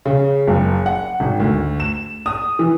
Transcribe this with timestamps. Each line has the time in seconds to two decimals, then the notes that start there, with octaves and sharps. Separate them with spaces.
0.05 C#3
0.47 F#1
0.86 F#5
1.20 G#1
1.40 D2
1.80 E7
2.26 D#6
2.59 E3